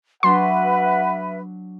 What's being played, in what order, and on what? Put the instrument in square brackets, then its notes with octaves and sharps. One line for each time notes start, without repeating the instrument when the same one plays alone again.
[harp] F#3 D4 [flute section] B4 E5 [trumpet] F#5 [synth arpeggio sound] C6